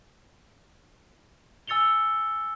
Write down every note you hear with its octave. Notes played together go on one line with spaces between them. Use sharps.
G#5 E6 A6 C#7 F7 G7